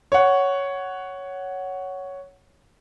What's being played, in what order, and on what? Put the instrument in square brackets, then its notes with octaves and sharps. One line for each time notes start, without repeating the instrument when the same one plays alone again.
[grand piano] C#5 F#5